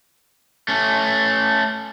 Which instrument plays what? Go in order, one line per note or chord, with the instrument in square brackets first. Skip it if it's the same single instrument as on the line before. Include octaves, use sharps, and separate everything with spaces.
[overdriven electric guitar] A3 C#4